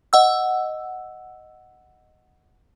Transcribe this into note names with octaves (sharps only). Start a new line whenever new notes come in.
D#5 F#5 E6